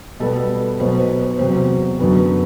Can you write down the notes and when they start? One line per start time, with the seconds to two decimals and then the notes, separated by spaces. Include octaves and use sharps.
0.20 B2 G3 B3 A4
0.79 B2 F#3 B3 C5
1.00 B4
1.19 C5
1.39 E2 C3 F#3 C5
1.99 F#2 D3 F#3 B3